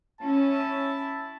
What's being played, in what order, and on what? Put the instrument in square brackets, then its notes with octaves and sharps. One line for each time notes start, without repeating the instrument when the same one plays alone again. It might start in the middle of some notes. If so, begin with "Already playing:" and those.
[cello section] C#4 [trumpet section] E4 A5